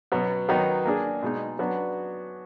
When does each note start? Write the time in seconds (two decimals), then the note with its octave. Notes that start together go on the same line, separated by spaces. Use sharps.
0.12 B2 F#3 B3
0.49 D#3 F#3 B3 D#4
0.85 A#3 D4 G#4
1.22 B2 G#3 D#4
1.59 F#3 B3 D4 F#4